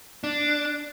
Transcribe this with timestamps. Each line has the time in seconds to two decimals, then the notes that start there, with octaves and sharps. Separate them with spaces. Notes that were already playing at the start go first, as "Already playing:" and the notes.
0.24 D4